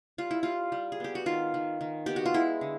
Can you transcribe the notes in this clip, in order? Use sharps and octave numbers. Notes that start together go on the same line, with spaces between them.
G3 F4
E4
G3 F4
G3
G#4
B3 G4
F#4
D#3 F4
D#3
D#3
B3 G4
F#4
F4
G#3 E4
D3